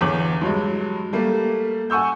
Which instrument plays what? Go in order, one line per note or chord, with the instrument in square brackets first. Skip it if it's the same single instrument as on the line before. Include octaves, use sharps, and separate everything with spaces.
[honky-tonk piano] G1 E2 C#5 D6 F#7
G2 F#3 G#3
G3 A3 A#3
F#5 G#5 C#6 E6 G6